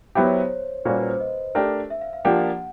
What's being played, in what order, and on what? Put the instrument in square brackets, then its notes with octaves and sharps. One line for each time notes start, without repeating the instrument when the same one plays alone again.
[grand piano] F#3 B3 E4 G4 [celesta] C5
[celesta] C#5
C5
[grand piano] A#2 G3 A#3 C#4 F#4 [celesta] C5
[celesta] B4
C5
D#5
[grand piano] A3 D4 G4 A#4
[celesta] E5
F5
F5
[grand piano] F3 A#3 D4 G4 [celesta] F#5